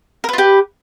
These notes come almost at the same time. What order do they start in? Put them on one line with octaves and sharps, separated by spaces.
A#4 B4 F4 G4